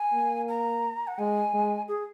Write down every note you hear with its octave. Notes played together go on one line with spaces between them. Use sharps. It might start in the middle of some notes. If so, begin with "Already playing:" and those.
Already playing: G#5
A#3
A#5
F#5
G#3 G#5
G#3
G#4